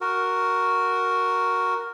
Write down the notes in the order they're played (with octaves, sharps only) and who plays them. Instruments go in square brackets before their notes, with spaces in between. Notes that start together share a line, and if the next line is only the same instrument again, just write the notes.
[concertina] F#4 A#4